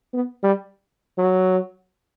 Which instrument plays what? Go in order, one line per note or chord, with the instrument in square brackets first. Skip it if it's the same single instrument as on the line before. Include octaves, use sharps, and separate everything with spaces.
[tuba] B3
G3
F#3